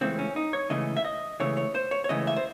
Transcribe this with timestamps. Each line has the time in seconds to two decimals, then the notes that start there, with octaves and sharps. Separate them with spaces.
0.01 C#2 C#3 E3 A3 C4
0.19 C#4
0.36 D#4
0.53 C#5
0.70 C#2 C#3 E3 A3 D#5
0.97 E5
1.05 D#5
1.40 C#2 C#3 E3 A3 C#5
1.57 C#5
1.75 C5
1.91 C#5
2.04 C#5
2.09 C#2 C#3 E3 A3 D#5
2.27 E5
2.36 C5